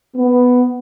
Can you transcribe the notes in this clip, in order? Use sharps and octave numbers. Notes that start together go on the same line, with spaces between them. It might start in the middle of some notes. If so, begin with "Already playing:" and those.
B3